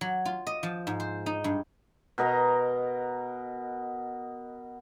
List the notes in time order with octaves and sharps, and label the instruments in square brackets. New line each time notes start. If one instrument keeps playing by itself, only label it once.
[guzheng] F#3
F4
D#5
F3
G#2
C5
D#4
G2
[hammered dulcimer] B2 A#4 D#5 A#5